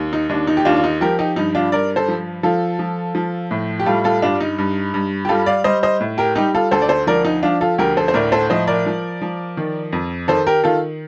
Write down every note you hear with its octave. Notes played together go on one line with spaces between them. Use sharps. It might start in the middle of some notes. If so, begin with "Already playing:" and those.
Already playing: D#2
D#4
D#2 D4
D#4
G4
D#2 D4 F4
F4
D#4
F3 G4 A#4
D#4 G4
G2 D#4
D4 F4
G2 A#4 D5
A4 C5
F3
F3 F4 A4
F3
F3
A2
G4
G3 F4 A4
F4 A4
G2 D4 F4
D#4
G2
G2
G4
G3 F4 A4
D5 F5
G3 C5 D#5
C5 D#5
A2
G4 A#4
G3 D#4 G4
F4 A4
D2 A4 C5
D5
A4 C5
F3 A#4 D5
D#4
F3 D4 F4
F4 A4
D2 G4 A#4
A4 C5
C5
A2 A#4 D5
A4 C5
F3 C5 D#5
A#4 D5
F3
F3
D#3
F2
D#3 A4 C5
G4 A#4
D#3 F4 A4